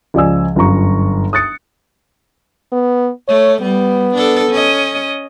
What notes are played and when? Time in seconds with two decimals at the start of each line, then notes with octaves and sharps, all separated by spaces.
0.14 C#2 F3 D5 G#5 E6
0.56 G1 F#2 F4 A#5 C#6
1.33 D#6 F#6 A6 C#7
2.73 B3
3.28 A3 C#5
3.62 G3 B3
4.15 D4 A4
4.51 C#4 D#5